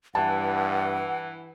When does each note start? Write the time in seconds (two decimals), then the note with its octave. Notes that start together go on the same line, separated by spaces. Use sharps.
0.15 G2 E3 F#5 A5